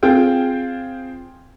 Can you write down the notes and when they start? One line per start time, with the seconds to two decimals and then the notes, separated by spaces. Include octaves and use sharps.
0.03 C4 F4 G#4 G5